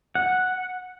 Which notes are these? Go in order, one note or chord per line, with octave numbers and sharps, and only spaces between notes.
F#5